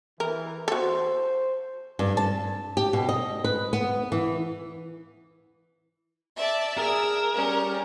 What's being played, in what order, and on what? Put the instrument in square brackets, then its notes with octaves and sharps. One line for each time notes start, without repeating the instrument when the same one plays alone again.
[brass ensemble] E3 [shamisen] A#4
[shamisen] F#4 A4 [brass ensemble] C5
[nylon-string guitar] G2
A5
G4
B2
D#5
B4
B3
E3
[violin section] D5 E5 A5
[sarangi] G#4 [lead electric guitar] A#4 [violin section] E6
[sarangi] G3 [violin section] C#4